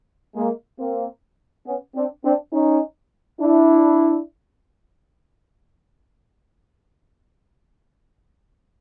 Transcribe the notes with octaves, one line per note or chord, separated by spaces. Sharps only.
G#3 A#3
A#3 C4
B3 C#4
C4 D4
C4 D4
C#4 D#4
D4 E4